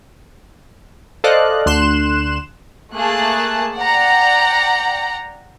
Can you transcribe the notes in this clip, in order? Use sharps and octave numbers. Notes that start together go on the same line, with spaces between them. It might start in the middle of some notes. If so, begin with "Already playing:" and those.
A4 C5 D5 D#5 F5 F#6
D2 D3 C6 F#6 E7
A3 A#3 G#4 A5 F#6
D5 F#5 G5 A#5